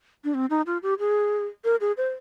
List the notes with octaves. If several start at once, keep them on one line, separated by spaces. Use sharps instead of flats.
D4
C4
D#4
F4
G4
G#4
A#4
G#4
C5